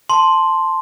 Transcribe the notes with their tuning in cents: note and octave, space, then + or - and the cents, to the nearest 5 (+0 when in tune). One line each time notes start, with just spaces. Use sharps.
A5 +0 C6 +0